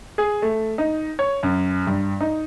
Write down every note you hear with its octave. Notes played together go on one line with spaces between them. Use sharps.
G#4
A3
D#4
C#5
F#2
G2
D#4